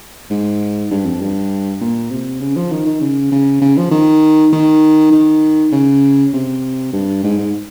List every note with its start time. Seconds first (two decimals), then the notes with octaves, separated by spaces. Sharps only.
0.30 G#2
0.91 G2
1.06 F2
1.21 G2
1.81 A#2
2.11 C3
2.40 C#3
2.56 F3
2.71 D#3
2.86 D#3
3.01 C#3
3.32 C#3
3.61 C#3
3.77 F3
3.91 D#3
4.53 D#3
5.12 D#3
5.72 C#3
6.34 C3
6.93 G2
7.24 G#2
7.38 G#2